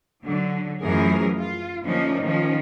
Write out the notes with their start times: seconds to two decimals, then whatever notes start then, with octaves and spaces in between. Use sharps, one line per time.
0.24 D3 F#3
0.82 F#2 E3 F3 A3 G#4 A#4
1.40 F4
1.86 D3 F3 A3 A#3 C#4 D#4
2.23 D#3 F3 C#4